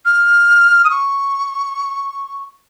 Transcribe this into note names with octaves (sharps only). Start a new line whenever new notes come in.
F6
D#6
C#6